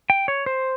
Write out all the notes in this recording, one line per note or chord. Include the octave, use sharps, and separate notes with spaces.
G5
C#5
C5